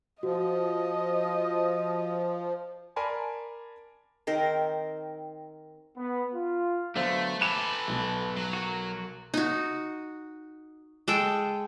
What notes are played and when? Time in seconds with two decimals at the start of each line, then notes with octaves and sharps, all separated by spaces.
0.23 F3 F#4 D#5
2.96 A#4 D5 G#5 A5 B5 C6
4.27 D#3 C4 A#4 C5
5.97 B3
6.33 F4
6.96 D3 F#3 A3 B3 C5 F5
7.41 A4 B4 F#5 G#5 B5 D6 E7
7.88 B1 B3
8.36 F#3
8.53 F#4 A#4
9.34 D#4 F#4
11.08 G#3 A4 G5